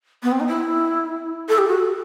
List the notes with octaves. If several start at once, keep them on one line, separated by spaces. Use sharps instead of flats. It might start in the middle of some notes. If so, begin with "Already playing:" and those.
B3
C4
D#4
E4
A4
G4
F#4